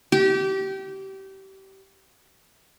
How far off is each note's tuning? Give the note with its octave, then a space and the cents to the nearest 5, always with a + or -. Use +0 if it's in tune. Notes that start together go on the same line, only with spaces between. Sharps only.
G4 -25